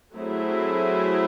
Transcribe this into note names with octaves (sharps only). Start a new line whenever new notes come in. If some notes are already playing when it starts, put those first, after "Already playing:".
F#3 A3 C4 E4 G#4